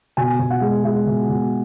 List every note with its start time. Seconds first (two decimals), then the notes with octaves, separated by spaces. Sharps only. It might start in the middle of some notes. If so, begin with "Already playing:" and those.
0.17 B2 G#5
0.39 B2
0.50 F#5
0.61 G#3
0.84 G#3 E5
1.07 B2
1.29 B2